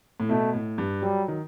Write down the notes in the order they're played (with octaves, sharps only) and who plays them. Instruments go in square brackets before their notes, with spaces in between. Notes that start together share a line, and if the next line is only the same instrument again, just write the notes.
[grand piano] A2
[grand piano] B2 [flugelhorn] A3
[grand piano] A2
G2
[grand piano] F#3 [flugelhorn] G3
[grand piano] D#3